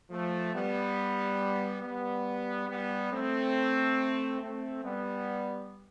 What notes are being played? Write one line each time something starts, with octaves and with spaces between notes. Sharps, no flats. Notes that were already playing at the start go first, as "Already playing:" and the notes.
F3 A3
G3 B3
G3 B3
G3 B3
A3 C4
A3 C4
G3 B3